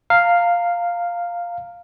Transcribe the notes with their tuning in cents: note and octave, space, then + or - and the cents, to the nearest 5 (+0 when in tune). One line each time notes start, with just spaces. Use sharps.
F5 +0 A#5 -30